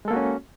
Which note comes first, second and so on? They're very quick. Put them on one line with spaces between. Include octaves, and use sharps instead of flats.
G#3 A4 A#3 F#4 C#4